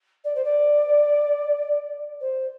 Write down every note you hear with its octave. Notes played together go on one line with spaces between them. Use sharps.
D5
C5
D5
C5